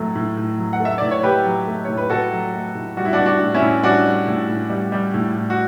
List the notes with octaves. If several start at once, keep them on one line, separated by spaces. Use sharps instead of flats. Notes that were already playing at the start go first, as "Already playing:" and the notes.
Already playing: A2 F#3 A3
A2
A2
F#3
F#5
A3 E5
A2 D5
C#5
A2 G4 B4
F#3
A3
A2 C#5
B4
A2 F#4 A4
F#3
A3
A2
G3 F#4
E4
D4 F#4
G3
D4 F#4
A2
C#4 E4
A2
G3 D4 F#4
G3
A2
A2
G3
G3
A2
A2
F#4